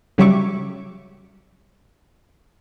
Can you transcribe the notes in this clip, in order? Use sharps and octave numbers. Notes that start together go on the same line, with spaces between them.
C#3 F#3 G3 E5 C#6 D6